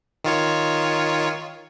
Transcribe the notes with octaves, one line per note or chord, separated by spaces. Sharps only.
D#3 F4 C#5